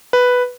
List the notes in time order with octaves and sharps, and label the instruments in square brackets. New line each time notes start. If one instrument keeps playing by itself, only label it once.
[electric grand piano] B4